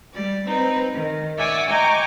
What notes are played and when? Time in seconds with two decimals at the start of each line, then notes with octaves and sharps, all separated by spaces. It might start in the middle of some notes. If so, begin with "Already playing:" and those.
0.13 G3 D5
0.46 C4 D#4 B4
0.94 D#3
1.37 C#5 D5 E5 F#5 G#5 D6
1.69 D#5 G5 G#5 A#5 C#6 D6